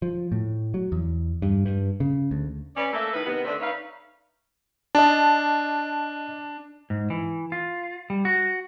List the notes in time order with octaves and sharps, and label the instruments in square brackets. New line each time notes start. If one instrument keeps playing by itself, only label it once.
[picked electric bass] F3
A2
F#3
E2
G2
G2
C#3
D2
[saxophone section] C#4 B4 D5
A3 A#3 A4 E5
D#3 E4 B4
C3 D#3 B3
D3 A3 C4 D4
D#4 B4 C#5 E5 F5
[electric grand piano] D4 [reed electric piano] D#5 A5
[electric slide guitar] G#2
E3
F4
G3
F#4